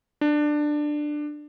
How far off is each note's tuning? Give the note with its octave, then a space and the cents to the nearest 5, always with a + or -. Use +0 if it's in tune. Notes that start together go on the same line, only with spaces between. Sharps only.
D4 +15